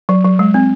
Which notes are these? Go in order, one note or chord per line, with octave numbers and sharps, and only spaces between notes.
F#3
F#3
G#3
C4